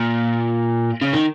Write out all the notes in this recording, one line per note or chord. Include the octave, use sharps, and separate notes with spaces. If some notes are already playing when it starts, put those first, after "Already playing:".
Already playing: A#2
C#3
D#3